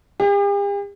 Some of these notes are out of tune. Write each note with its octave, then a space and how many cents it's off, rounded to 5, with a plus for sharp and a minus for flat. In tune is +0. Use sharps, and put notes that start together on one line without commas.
G4 +45